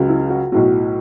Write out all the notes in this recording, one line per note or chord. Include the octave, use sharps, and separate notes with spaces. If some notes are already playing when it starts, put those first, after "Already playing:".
Already playing: C#2 C#3 F#3
E4
F#4
B1 A2 F#3